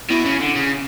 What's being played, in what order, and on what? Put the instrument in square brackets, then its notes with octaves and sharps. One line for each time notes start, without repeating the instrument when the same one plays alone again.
[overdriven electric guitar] B2 [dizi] E4
[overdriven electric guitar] C#3
D3
C#3